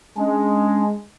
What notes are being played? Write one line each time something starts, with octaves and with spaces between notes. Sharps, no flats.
G#3 C#4 D4